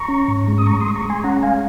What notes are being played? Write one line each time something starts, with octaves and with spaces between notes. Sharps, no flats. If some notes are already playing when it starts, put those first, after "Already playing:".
Already playing: A#5 C#6
C#4
G#2
G#3
D#6
G#3 A#5 C#6
C6 D#6
G#3
A#5 C#6
G#3 G#5 C6
C#4 F#5 A#5
G#3 F5 G#5